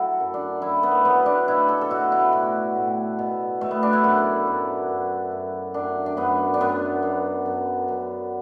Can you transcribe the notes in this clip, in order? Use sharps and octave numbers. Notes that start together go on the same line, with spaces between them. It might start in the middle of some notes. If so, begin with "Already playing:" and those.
Already playing: F#3 E4 F#4 A4
F#2
D4
F#2 E4
B3
F#3 B3
D4
B2 E4
A4
A4
B2 F#4
E4
A2 F#4
A2
B2
B2 A3
B3
D4
E4
F#2 F#4
F#2
F#2
F#2
F#2 D4
D4
F#2 B3
D4
F#2 B3
F#2
F#2
F#2